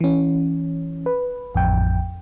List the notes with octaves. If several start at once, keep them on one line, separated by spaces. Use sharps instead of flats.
E3 C#4
B4
A1 F2 G5